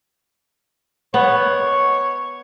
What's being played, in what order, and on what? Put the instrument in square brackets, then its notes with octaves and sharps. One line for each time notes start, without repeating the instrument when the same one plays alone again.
[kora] B3 [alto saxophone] C#5